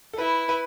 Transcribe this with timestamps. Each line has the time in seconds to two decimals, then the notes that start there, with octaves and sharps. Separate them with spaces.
0.13 A4
0.18 E4 B4
0.49 B4